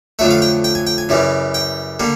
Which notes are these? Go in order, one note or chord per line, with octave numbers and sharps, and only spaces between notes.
F2 D3 F#3 A3 E5
F5
G5
G5
G#5
G5
G#5
F#2 C#3 E3 G3
G5
D3 G3 A#3